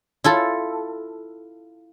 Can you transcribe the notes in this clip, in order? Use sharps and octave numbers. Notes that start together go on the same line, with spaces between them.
E4 F4 A4